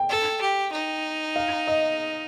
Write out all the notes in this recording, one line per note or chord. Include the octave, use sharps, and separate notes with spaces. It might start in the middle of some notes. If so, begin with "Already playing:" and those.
Already playing: G5
A4
G4
D#4
F5
D#5